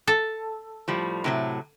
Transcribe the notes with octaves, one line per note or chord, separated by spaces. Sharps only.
A4
A2 F3 G3
A2 C3 F#3